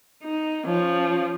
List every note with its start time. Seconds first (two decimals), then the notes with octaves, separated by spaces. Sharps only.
0.24 D#4
0.65 F3 C#4